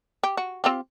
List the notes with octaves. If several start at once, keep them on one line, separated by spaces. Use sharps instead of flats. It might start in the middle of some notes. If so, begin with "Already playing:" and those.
G4
F#4
C4 F4 G4